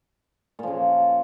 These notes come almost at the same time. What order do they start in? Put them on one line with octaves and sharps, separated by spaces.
A#2 F3 C#3